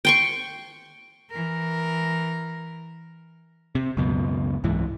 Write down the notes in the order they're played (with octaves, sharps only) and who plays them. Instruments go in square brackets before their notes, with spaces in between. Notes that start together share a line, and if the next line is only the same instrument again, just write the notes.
[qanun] G5 C6 C#6
[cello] E3 A#4
[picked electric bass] C3
C#2 F#2 B2
C2 G#2 E3